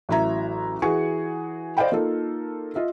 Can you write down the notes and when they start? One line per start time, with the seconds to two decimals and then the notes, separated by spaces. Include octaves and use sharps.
0.09 A1 F#3 E4 E5 A#5 G#6
0.82 E3 F#4 G#4 G#5 C#6 C#7
1.77 C5 D5 D#5 F5 G5 B5
1.92 A#3 D#4 F4 A4
2.75 F4 D#5 E5